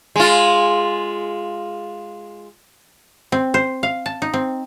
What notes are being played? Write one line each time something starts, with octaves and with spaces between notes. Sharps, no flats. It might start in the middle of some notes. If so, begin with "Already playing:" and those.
G#3 F4
C4
C5
F5
A5
D#4
C4